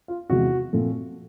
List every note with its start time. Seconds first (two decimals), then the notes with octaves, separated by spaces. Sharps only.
0.08 F4
0.30 E2 C3 F3 G#3 F#4
0.73 A#2 F3 A3 C4